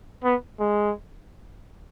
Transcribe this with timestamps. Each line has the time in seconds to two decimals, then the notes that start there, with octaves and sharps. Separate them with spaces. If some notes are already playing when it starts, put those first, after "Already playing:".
0.24 B3
0.60 G#3